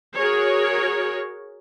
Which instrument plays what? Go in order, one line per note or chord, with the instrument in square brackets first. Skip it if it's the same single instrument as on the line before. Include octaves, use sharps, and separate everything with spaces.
[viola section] F#4 G#4 A#4 C#5